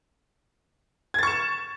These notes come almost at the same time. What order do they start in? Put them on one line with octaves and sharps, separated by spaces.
G#6 A6 C#6 E7